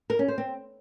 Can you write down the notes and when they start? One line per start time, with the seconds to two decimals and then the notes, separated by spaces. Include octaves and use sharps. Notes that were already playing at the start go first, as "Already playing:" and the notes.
0.10 A#4
0.19 C#4
0.28 C5
0.38 C4